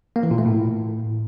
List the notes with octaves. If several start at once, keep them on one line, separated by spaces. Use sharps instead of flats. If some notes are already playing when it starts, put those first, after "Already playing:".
A#3
E3
A#2
A3
A2